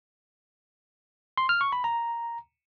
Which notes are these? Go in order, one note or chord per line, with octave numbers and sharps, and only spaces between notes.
C6
F6
C#6
B5
A#5